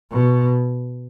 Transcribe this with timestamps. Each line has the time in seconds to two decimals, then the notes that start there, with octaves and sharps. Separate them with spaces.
0.12 B2